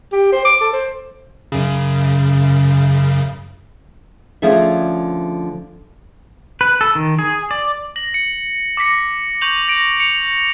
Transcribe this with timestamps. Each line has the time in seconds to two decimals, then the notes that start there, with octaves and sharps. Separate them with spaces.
0.12 G4
0.32 C5
0.45 D6
0.61 A4
0.73 C5
1.52 F#2 C#3
4.42 D2 D3 F3 C#4 G#4 E5
6.61 B4
6.81 A4
6.95 D#3
7.19 G#4
7.51 D5
7.96 A#6 F#7
8.14 C#7
8.77 D6 A#6 B6 C#7
9.41 C#6 G6 F7 F#7
9.68 A#6 D7
10.00 C#7 F7